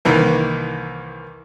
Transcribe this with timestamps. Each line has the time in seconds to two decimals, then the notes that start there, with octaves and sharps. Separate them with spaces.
0.05 C2 D#3 E3 A#3